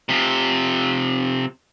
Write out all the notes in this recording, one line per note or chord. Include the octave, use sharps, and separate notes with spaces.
C3 F3